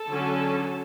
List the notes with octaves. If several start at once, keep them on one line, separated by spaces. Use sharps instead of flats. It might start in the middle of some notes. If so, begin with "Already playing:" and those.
Already playing: A4
D3 F#3 C#4